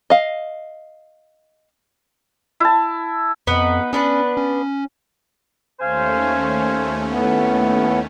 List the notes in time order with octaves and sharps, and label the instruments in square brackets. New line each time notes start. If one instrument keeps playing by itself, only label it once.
[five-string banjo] D#5 F5
[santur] E4 A5
[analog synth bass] F2 [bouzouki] B3 D#4
[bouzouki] B3 D4 B4 [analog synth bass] C#4
[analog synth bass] C#4
[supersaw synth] D#2 A3 C#4 [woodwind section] C5 F5 G#5
[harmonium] A2 B3